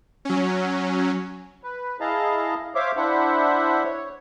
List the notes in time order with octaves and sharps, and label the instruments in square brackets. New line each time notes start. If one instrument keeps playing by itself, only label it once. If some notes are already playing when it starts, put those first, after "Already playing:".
[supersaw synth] F#3 C#4
[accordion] B4
E4 G#4 D#5 F5 A5 A#5
C5 C#5 E5 F5 D6
D4 E4 C5 E5 F#5
C#5